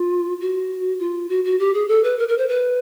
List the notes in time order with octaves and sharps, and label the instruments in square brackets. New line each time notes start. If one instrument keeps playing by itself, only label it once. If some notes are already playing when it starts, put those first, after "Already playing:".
Already playing: [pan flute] F4
F#4
F4
F#4
F#4
G4
G#4
A4
B4
A#4
A#4
C5
B4